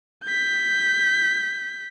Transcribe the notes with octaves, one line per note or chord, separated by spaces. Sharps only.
G6 B6